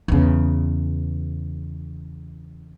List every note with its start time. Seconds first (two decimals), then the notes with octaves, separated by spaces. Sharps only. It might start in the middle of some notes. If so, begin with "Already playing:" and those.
0.08 E2 C#3